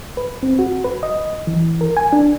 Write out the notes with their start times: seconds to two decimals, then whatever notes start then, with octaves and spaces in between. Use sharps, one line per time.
0.17 B4
0.43 C4
0.59 F#4
0.84 B4
1.03 D#5
1.47 E3
1.81 A#4
1.97 G#5
2.13 D4